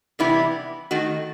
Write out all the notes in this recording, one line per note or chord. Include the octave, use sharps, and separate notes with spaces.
C3 E3 G3 B3 E4
D#3 A3 F#4